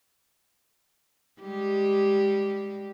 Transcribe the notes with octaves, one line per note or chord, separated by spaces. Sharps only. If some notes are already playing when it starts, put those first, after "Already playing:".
G3 G#3 G4